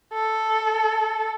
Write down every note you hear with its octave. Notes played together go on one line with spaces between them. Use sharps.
A4